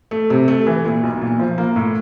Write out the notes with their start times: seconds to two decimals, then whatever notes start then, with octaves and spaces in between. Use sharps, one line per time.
0.11 A3
0.30 C3
0.48 A3
0.67 E3
0.85 A#2
1.03 B1
1.21 A#2
1.40 F3
1.58 A#3
1.76 A2